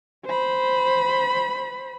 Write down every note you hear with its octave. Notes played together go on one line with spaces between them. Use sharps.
C5 B5